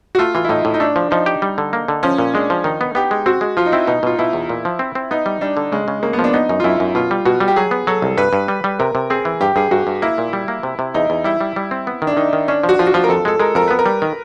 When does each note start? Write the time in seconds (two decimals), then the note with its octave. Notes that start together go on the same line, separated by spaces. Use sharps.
0.15 F#4
0.19 A3 F4
0.35 E3 F4
0.44 E4
0.49 A2 D#4
0.65 A2
0.74 D#4
0.80 A3 D4
0.96 F3
1.11 F3 D#4
1.26 G4
1.42 G3
1.58 D3
1.73 A#3
1.88 D3
2.03 F3 C#4
2.18 A#2
2.34 G#3 D4
2.50 F3
2.64 D#3 D#4
2.81 B3
2.95 B3 G4
3.11 G#3
3.26 C4 F#4
3.41 G#3
3.57 F3 F4
3.65 D#4
3.72 C4 E4
3.87 B2 D#4
4.03 B2 F4
4.19 B2 E4
4.33 E2
4.49 A#2
4.65 F3
4.79 C4
4.95 C4
5.11 B3 D#4
5.26 G3
5.41 G3 D4
5.57 D3
5.72 C#3 G#3
5.88 C#3
6.03 C#3 A#3
6.13 B3
6.19 F3
6.24 D4
6.33 B3 D#4
6.49 F#2 D#4
6.60 F4
6.64 F#2 E4
6.80 F#2
6.95 B2 F4
7.11 G3
7.25 B2 F#4
7.40 G3
7.48 G4
7.56 F#3 G#4
7.71 B3
7.87 F#3 A4
8.02 C2
8.18 G2 B4
8.33 G2
8.48 G3
8.64 G3
8.79 C3 A#4
8.95 C3
9.10 C4 G#4
9.25 E3
9.41 G2 G4
9.56 G2 G#4
9.71 G2 F#4
9.87 G2
10.02 A#3 E4
10.18 A#2
10.33 G3
10.48 A#3
10.63 C3
10.79 C3
10.94 E2 D#4
11.10 E2
11.24 G3 E4
11.41 G3
11.56 G3
11.71 C4
11.87 B3
12.02 D#3
12.07 D4
12.17 D#3 D#4
12.33 D#3
12.48 C#4 D4
12.63 F3
12.69 F#4
12.79 F3 F4
12.87 F#4
12.94 F3 F4
13.04 A#4
13.09 F2 A4
13.25 G#3 A4
13.40 G#3 A#4
13.55 F2 A#4
13.68 B3 B4
13.79 A#4
13.86 G3
14.02 D#3